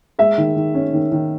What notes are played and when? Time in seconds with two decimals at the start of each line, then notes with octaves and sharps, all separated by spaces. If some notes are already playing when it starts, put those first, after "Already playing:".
0.19 G#3 E5
0.38 D#3
0.56 D#3
0.74 C#4
0.93 D#3
1.12 D#3